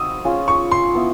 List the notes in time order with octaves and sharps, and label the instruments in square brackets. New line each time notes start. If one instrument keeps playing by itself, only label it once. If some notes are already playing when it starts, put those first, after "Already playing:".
Already playing: [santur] C4 D#4 F#4 [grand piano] D#6 E6
[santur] C#4 F4 G#4
[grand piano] C#6
C6
[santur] B3 E4